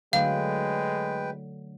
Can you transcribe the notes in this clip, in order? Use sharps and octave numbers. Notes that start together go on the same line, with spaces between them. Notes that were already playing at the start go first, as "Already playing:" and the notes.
D3 F#3 G#3 A3 B4 F5 G5